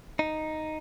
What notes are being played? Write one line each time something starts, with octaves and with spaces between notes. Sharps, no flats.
D#4